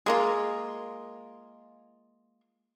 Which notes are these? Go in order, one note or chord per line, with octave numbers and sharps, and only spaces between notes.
G#3 A#3 F4 G#4 A#4